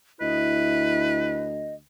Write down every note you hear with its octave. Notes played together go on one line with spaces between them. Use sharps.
D2 E4 B4 D#5